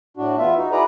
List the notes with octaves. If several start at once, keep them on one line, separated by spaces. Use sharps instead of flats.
A2 D4 F#4
E2 B3 F4 E5
D#4 F#4
E4 F#4 G#4 B4 D5 A#5